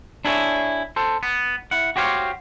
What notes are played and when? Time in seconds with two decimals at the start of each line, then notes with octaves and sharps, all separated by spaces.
0.25 D4 E4 G#4 A4 C#5 E5
0.96 A4 C5
1.23 B3
1.71 E4 F#5
1.96 F#4 G4 C5 C#5 F5